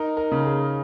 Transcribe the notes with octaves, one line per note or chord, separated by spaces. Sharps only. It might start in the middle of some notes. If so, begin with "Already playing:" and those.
Already playing: D#4 A#4
A#4
C#3
G#4